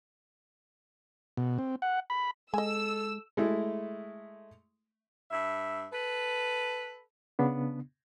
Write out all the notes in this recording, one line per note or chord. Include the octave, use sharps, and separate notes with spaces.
B2
C4
F#5
B5
G#3 A4 D#5 G#5 E6
G#3 A3 E4
G2 E5
A4 B4
C#3 B3 D4